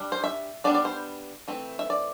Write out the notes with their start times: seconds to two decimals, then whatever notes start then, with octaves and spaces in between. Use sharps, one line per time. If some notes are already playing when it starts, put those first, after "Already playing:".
Already playing: G3 D4
0.12 C5
0.24 E5
0.64 G3 B3 D4 D5
0.75 D5
0.85 C5
1.48 E3 A3 C4
1.79 E5
1.90 D5